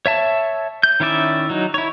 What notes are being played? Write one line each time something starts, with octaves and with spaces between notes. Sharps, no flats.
C#5 E5 A5
G6
D#3 C#4 E4 D5 E5
F#3 D#4
E4 C#5